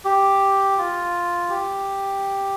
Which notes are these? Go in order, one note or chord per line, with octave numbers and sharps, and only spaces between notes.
G4
F4
G4